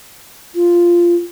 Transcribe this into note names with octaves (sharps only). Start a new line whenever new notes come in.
F4